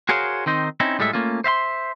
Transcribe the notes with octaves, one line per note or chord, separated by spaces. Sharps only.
F#4 G#4 A#4 C5 C#5 F5
D#3 C4 D#4 C5
C4 C#4 D#4 E4
A2 G3 G#3 A4 E5
A3 A#3 C#4 F4
C5 E5 F5 C6